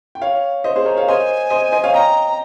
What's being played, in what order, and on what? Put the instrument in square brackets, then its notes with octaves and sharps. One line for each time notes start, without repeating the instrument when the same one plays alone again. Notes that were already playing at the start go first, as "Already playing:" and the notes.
[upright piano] G5
C#5 F5
C5 D#5
G#4 C5
A#4 C#5
C#5 F5
[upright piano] C5 D#5 [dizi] G#5
[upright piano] C5 D#5
C5 D#5
C#5 F5
[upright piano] D#5 G5 [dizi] A#5